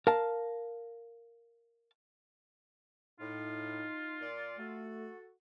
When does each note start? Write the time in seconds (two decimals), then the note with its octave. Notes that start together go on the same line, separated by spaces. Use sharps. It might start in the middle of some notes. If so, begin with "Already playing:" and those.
0.07 A#4 F5 A5
3.20 A2 D#4 F4
4.20 A#2 D5
4.58 A3 F#4 A4